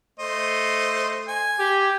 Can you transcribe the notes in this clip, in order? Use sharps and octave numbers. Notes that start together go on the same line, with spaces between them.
A3 C5 D#5
G#5
G4